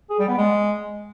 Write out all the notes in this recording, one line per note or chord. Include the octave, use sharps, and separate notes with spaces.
G#4
G3
B3
G#3